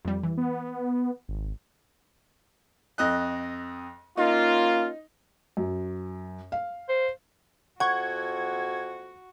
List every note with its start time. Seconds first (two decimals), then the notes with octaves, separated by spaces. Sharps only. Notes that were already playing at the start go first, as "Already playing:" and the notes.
0.05 F2 G3
0.23 E3
0.37 B3
1.28 G#1
2.98 F2 D#5 F#6
4.17 A#3 C#4 D#4 F4
5.57 F#2
6.52 F5
6.89 C5
7.80 F2 F#4 F#5 C#6 G#6